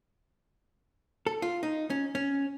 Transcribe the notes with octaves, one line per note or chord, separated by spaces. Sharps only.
A4
F4
D#4
C#4
C#4